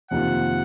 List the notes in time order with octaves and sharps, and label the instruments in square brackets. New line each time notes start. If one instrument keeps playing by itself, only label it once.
[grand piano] F2 C3 D#3 A#3 F4 [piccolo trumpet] F#5